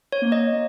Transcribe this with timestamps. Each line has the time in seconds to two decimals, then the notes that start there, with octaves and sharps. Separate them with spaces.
0.12 C#5
0.22 A#3
0.32 D#5
0.53 A#3